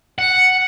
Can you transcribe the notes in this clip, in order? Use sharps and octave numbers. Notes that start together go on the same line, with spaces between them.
F#5